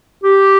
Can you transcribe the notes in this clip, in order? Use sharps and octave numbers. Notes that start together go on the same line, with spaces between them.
G4